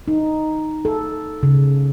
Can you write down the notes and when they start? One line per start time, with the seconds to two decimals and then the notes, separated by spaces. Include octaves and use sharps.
0.08 D#4
0.85 A4
1.43 C#3